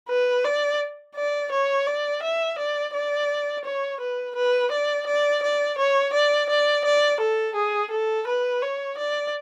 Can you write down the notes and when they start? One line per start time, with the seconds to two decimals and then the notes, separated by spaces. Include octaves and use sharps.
0.09 B4
0.44 D5
1.16 D5
1.52 C#5
1.87 D5
2.23 E5
2.58 D5
2.94 D5
3.65 C#5
4.00 B4
4.36 B4
4.72 D5
5.07 D5
5.43 D5
5.78 C#5
6.13 D5
6.50 D5
6.85 D5
7.21 A4
7.56 G#4
7.91 A4
8.27 B4
8.62 C#5
8.98 D5